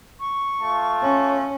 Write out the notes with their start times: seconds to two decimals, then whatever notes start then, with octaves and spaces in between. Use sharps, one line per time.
0.20 C#6
0.60 A3 F4 A5
1.02 C#4